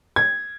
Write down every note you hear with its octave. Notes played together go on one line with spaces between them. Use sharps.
G#6